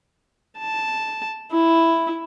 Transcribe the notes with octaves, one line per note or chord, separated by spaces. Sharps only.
A5
E4